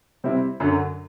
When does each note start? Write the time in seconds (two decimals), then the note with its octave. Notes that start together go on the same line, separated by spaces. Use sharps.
0.24 C3 G3 C4 E4
0.60 F#2 D3 F#3